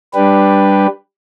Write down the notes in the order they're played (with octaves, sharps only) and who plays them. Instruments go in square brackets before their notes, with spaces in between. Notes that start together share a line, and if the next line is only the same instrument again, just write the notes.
[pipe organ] G3 D4 G4 B4